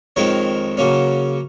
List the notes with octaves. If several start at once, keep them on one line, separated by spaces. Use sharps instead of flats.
F2 D#3 G#3 C4 A#4 C#5
C#3 F#3 A#3 C#4